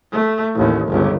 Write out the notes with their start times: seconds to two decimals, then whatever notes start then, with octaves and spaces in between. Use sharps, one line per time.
0.12 A3
0.55 A1 D#2
0.88 G1 C#2